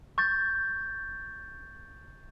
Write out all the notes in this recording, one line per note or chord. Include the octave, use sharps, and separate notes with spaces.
C#6 G6 A6